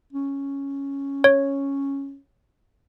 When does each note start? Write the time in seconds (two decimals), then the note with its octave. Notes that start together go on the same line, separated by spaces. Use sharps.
0.13 C#4
1.24 C#5